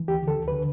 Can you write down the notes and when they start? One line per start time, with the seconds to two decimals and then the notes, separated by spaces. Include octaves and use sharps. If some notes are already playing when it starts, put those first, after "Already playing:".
Already playing: E3
0.08 D2 G4
0.22 D3
0.28 A4
0.38 D2
0.48 D3 B4